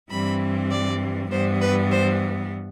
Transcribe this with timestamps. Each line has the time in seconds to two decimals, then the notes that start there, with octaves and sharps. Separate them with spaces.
0.10 G2 E3 G3 C4 B5
0.71 D5
1.31 G2 E3 G3 B3 C5
1.61 B4
1.91 C5